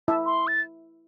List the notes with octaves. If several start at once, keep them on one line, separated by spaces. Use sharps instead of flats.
E4 E5 A5
C6
A6